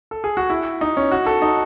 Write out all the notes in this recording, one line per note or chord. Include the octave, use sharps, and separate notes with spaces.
A4
G#4
F#4
E4
D#4
C#4
F#4
A4
D#4